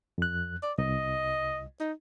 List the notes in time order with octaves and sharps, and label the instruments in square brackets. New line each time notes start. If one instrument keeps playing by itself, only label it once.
[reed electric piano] F2 F#6
[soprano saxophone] D5
[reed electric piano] C2 [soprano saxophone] D#5
[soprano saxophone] D#4